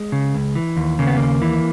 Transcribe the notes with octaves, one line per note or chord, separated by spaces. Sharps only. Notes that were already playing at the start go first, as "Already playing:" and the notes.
Already playing: G#3
C#3
C#2
E3
D#2
C#3 A#3
B3
D#2 A#3
E3